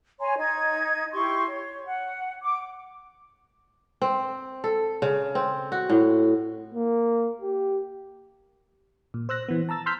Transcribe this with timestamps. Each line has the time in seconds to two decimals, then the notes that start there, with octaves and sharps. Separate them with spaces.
0.20 C#5 G#5 A#5 C6
0.38 D#4 D#5 G#6
1.13 E4 G4 C6 C#6
1.49 C#5
1.86 F#5
2.43 D6
4.01 C4
4.64 A4
5.02 C#3
5.35 C4
5.72 F#4
5.89 A2
6.74 A#3
7.41 G4
9.14 A#2
9.29 C5 E6 F#6 A#6
9.49 E3 B3
9.69 A5 A#5 E6 A6
9.86 C6 E6 F6 G6 B6